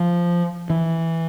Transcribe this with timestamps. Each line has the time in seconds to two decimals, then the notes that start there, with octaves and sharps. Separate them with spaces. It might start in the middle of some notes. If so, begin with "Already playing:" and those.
Already playing: F3
0.70 E3